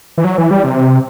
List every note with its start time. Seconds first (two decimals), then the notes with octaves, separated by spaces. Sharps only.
0.18 E3
0.24 F#3
0.38 E3
0.51 G3
0.63 C3